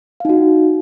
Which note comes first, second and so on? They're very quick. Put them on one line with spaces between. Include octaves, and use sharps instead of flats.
F5 D#4 F#4